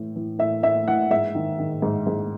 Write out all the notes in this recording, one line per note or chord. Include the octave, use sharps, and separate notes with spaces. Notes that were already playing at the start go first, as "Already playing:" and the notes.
Already playing: A2 E3
E3
A2 E5
A2 E5
E3 F#5
G#2 E5
D#3
D#3
G#2
G#2